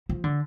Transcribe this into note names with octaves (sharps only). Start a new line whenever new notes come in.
F3
D3